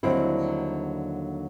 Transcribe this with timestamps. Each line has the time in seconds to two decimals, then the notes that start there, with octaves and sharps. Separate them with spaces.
0.03 D#2 D3 F#3 G3 C4 E4